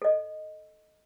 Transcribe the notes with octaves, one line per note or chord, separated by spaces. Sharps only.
A4 D#5